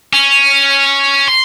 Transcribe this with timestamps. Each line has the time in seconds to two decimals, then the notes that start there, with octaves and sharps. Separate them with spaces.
0.13 C#4
1.28 C6